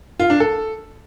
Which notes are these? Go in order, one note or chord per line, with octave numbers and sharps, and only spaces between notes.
F4
D4
A4